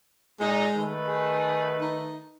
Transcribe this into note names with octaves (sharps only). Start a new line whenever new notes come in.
A#2 G#3 D#4
D#3 A3 B4
G#4
D#4